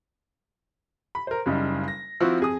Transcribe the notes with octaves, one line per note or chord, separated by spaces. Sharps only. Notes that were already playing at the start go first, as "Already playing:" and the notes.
B5
A#4 C5
F#1 C#3 G3 D#4
A#6
F3 C4 E4 F#4
F2 G#4 D#6